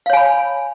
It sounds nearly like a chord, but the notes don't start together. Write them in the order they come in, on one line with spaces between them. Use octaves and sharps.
F5 C#5 G#5 B5